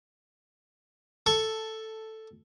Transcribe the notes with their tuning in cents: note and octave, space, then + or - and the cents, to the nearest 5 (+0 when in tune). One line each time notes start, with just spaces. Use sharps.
A4 +0 C#6 +0